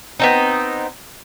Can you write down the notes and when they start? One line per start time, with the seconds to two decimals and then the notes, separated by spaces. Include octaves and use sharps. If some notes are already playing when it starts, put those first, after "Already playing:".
0.20 B3 C4 D#4